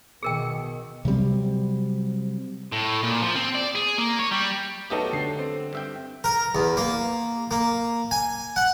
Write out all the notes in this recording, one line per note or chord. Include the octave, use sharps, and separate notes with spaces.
B2 D#3 G#4 A#4 G5
C3 F#3 G3 C4
A2
A#2
F3
C4
D5
G#4
A#3
C#5
G3
F#3 A3 B3 D#4 G4 A4 G5
D3 C7
C4
G2 E5 G5
A#4
E2
A#3
A#3
G#5
F#5